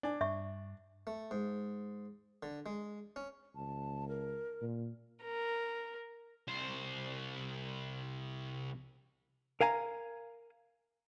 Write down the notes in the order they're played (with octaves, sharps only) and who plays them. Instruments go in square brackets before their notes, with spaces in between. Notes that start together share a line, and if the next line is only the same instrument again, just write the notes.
[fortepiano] D4 [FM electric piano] D5 G#5
[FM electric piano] G2 [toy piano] E5 C#6
[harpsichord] A3
G#2
D3
G#3
C#4
[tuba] C#2 [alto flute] A5
[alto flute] A#4
[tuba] A#2
[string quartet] A#4
[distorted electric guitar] C2 C5
[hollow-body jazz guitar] A#4 F5 G#5 A#5